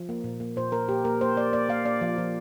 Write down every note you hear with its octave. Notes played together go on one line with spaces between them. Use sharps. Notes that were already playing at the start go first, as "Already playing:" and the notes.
Already playing: F3
A#3
A#2
A#3
A#2 C5
A#3 A#4
A#2 G4
A#3 A#4
A#3 C5
A#3 D5
A#3 D5
A#3 F5
A#3 D5
F3
F3